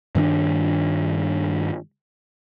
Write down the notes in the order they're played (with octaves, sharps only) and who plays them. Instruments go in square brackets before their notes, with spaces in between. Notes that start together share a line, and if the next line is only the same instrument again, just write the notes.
[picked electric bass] G2 D#3 C4 D4